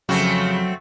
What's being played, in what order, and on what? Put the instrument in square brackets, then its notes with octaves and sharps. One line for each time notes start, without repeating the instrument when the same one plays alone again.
[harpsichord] F2 [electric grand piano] C#3 [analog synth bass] F#3 [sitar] A3 C4 F#4